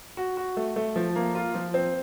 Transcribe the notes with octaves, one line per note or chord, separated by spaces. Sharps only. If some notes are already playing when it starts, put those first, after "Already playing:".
F#4
F#4
A3
A3
F3
A#3
F4
F3
C4